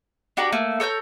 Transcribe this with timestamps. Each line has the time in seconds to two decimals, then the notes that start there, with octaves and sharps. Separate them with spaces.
0.37 D4 F#4 G4 A#5
0.52 A3 A#3
0.80 A4 C#5 A#5 G6